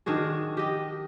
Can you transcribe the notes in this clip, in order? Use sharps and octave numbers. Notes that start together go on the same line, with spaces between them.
D#3 D4 F#4 G#4
G4 D#5